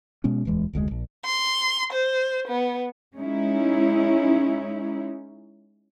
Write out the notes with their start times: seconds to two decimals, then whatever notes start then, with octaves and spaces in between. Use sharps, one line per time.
0.24 B2 G#3 B3 C#4
0.45 D1 E2 E3 G#3
0.73 F1 D2 C3 G#3
0.91 A#1
1.26 C6
1.93 C5
2.48 B3
3.16 G#3 C#4 D#4 E4